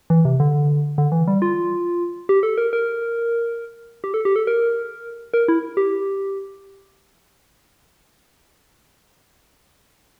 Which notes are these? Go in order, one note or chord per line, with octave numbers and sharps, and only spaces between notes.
E3
C3
D3
D3
E3
G3
F4
G4
A4
A#4
A#4
G4
A4
G4
A4
A#4
A#4
E4
G4